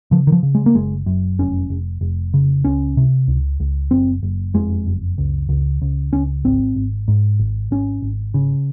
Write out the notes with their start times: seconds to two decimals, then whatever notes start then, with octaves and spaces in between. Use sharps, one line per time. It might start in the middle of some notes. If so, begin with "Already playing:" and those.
0.11 C#3 F3
0.27 D#3
0.32 F3
0.43 C#3
0.55 G#3
0.66 A#3
0.74 F#1 G#3
1.06 F#2
1.39 F1 C#4
1.70 F1
2.01 F1
2.34 C#3
2.65 C#2 C#4
2.97 C3
3.28 C#2
3.60 C#2
3.91 F#1 C4
4.23 F#1
4.54 F2 G#3
4.86 F#1
5.18 C#2
5.49 C#2
5.82 C#2
6.13 C#2 C#4
6.44 G#1 C4
6.76 G#1
7.08 G#2
7.40 G#1
7.71 G#1 C#4
8.02 G#1
8.34 C#3